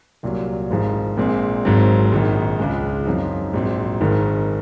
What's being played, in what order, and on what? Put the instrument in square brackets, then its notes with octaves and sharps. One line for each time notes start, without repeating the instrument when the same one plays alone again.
[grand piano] C2 A#2 F#3
G#1 G#2 F3
A#1 A#2 G#3 C4
G#1 G#2 F#3 C4
A#1 G#2 D#3
C#2 C#3 G#3
F#2 F3 C4 D#4
A#1 G#2 F#3 C4
G#1 G#2 D#3